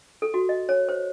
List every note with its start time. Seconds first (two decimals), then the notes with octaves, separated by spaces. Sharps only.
0.22 A4
0.34 F#4
0.49 D#5
0.69 C#5
0.89 C5